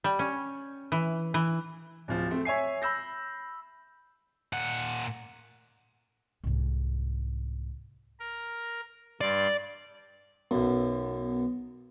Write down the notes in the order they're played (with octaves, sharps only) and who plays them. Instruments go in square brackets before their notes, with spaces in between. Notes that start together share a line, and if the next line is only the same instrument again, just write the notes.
[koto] G3
C#4
E3
E3
[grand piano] D1 F3
A3 C4
C#5 E5 G#5 C7
B5 E6 G6 A#6
[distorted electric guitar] A#2 F#5
[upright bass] C2 G#2
[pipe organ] A#4
[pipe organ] G2 C6 [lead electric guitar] D5
[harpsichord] B1 F#2 [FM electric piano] B3